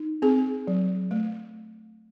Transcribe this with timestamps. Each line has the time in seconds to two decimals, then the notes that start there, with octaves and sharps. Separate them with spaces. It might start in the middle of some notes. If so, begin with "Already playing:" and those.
Already playing: D#4
0.22 C4 G#4
0.67 F#3
1.11 A3